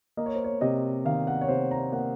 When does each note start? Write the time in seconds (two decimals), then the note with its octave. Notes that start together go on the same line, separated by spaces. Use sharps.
0.17 A#3 D#5
0.26 C#5
0.35 C5
0.44 C#5
0.61 C3 D#5
1.05 D#3 F5
1.27 F#5
1.41 C#5
1.48 C3 C5
1.71 A#5
1.92 A#3 F#5